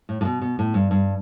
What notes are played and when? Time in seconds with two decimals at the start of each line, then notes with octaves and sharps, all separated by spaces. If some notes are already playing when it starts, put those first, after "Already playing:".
0.09 A2
0.21 A2
0.25 B2
0.41 B2
0.59 A2
0.74 G2
0.91 G2